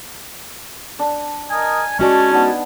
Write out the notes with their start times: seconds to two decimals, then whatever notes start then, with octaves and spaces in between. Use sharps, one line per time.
0.99 D4
1.50 A#4 D#5 G#5
1.99 G#3 C#4 F#4 D5 G#5 A5
2.30 B3 D4 D#4